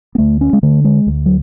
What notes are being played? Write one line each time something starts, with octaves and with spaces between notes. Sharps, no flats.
B3
D2 A3
C#4
G#3
D3 A3
G#3
D2
F#3